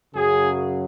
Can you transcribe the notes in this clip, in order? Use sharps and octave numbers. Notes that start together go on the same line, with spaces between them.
F#2 C#3 F#3 G#4